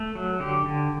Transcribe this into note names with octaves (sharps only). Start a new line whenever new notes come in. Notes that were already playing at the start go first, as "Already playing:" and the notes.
Already playing: A3
F#3
D3 G4
D3